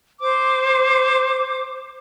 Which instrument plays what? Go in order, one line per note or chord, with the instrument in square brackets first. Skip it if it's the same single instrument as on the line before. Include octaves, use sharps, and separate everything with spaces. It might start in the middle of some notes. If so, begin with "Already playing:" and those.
[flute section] C5 D6